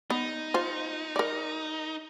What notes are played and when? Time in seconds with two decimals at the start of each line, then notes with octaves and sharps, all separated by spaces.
0.10 B3 D#4
0.54 F4 C5
1.16 A#4 D5